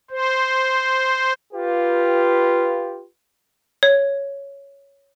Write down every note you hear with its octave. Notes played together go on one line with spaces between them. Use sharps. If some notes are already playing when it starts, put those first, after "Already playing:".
C5
F4 G4 B4
C#5